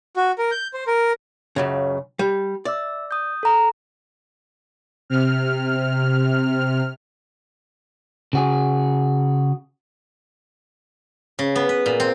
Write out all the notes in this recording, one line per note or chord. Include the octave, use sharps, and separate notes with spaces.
F#4
A#4
G6
C5
A#4
C#2 F#2 C#3
G3
D5 E5 E6
D#6 G6
A4 A#5
C3 F6
C#3 F#4 G#4
C#3
B3
B4
A#2
C4